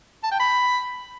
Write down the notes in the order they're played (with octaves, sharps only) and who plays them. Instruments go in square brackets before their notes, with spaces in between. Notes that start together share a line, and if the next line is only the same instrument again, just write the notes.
[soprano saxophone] A5
G5
B5